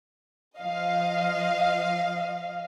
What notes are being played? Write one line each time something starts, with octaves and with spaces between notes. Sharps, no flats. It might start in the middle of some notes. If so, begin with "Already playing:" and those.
F3 D#5 F5